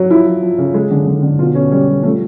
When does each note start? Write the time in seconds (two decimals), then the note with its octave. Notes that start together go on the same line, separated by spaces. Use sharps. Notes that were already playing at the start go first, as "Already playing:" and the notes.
Already playing: F#3
0.10 F3 E4
0.26 F3
0.42 F3
0.58 C#3
0.74 G#3
0.91 D3
1.07 D3
1.23 D3
1.39 B2 F4
1.55 B2 C#4
1.71 G3 C#4
1.87 G3
2.03 F3 A3